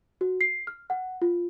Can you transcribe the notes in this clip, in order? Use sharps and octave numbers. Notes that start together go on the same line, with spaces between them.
F#4
C7
F6
F#5
F4